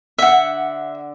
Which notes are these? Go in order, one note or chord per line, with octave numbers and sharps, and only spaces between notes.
D3 E5 F#5